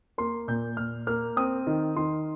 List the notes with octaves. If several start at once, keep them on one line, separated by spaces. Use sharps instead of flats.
A#3 C6
A#2 G6
A#2 F6
A#3 F6
C4 D#6
D#3
D#3 C6